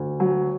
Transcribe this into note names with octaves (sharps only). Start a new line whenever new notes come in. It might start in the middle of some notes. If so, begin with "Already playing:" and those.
Already playing: D2
F#3